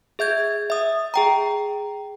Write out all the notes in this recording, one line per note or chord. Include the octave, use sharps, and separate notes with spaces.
G#4 E5 G6 G#6
E5 D#6
G#4 G5 A#5